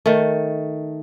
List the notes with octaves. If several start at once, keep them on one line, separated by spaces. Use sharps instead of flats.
D#3 A3